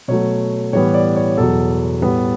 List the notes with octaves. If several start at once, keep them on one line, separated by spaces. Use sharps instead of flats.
B2 F#3 A3 C#5
A2 E3 G3 B3 C#5
D5
C#5
E2 B2 F#3 A4
A2 G3 B3